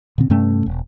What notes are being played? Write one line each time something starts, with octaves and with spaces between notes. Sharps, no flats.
A#2 D3 C4
G2 C3 A3 C#4
E1